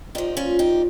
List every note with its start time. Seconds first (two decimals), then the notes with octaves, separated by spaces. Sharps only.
0.15 A#2 F3 D#4 G4
0.37 C#4 F4
0.59 D#4 G4